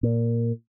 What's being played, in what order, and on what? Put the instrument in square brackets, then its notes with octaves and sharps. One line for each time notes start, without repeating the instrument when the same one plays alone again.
[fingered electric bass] A#2